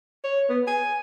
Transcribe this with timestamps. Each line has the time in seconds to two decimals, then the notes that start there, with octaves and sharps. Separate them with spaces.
0.24 C#5
0.49 B3
0.67 G#5